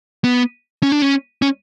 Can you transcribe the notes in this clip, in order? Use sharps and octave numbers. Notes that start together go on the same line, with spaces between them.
B3
C#4
D4
C#4
C#4